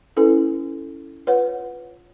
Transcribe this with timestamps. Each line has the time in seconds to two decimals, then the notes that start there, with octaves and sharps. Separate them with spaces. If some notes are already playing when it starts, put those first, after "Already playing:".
0.17 C#4 E4 A4 B4
1.27 F4 B4 C#5 F#5